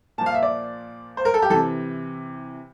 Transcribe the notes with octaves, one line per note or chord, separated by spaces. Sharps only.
A#2 F3 A5
F5
E5
D5
C5
A#4
A4
G4
C3 E3 A4